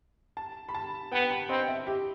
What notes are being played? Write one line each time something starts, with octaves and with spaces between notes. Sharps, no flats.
A5
B5
A5
B3 G5
B5
C4 D#5
E5
G4